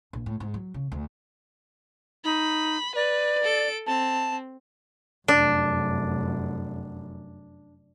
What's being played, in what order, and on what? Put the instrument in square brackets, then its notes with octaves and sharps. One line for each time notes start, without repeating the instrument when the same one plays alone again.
[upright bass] A#1
A2
G#2
F#3
C#3
D2
[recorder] D#4 [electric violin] B5
[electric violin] B4 [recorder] D5
[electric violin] A4 D7
[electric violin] C4 [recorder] A5
[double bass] F1 F#2 [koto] D4